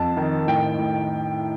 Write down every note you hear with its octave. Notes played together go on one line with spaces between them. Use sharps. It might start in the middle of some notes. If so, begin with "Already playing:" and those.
Already playing: F2 A5
D#3
A2 G5
A2